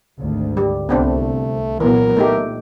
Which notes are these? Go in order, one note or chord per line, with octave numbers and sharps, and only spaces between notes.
G#1 D2
G3
C2 A3 B3 C4 D4
A#2 E3 F#3 B3 A#4
A#2 A3 D#4 G4